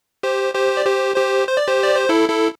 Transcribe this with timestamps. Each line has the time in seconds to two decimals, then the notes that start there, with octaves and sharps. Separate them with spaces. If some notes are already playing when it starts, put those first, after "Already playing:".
0.23 G4 C5
0.54 G4 C5
0.77 D5
0.85 G4 C5
1.16 G4 C5
1.47 C5
1.57 D5
1.67 G4 C5
1.83 D5
1.96 C5
2.09 E4 A4
2.29 E4 A4